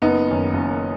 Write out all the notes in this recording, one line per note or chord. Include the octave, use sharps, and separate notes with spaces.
F#1 B3 D#4
F#2 D#3
F#1